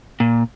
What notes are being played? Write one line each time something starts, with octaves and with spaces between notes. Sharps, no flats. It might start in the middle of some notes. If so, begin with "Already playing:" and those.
A#2